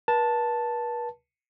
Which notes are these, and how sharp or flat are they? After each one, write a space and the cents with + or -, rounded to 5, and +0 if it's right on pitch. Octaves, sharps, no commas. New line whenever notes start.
B4 -45 A5 +0